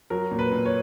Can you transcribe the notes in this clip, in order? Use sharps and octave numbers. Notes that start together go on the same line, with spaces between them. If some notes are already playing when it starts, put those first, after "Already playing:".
F#3 A#4
A#2
B4
A#2
C#5